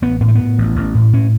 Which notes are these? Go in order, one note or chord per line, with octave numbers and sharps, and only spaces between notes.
A1 B3
A2 B3
A3
A2 B3
A1
A1
A2
A2 C#4